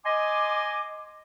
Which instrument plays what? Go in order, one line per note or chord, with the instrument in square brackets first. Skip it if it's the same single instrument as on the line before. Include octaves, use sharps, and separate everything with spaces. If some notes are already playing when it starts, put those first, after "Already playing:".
[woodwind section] D#5 G#5 C6 D6